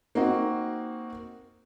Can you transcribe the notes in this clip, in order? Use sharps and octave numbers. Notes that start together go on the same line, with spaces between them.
A#3 C4 D#4 F#4